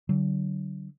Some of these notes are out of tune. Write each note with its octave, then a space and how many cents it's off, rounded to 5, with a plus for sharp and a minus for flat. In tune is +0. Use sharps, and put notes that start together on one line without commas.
D3 -5 F#3 +30